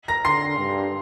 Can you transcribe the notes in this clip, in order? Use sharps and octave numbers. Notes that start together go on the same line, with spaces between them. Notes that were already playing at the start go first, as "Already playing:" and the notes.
A#5 A#6
D3 C6 C7
G2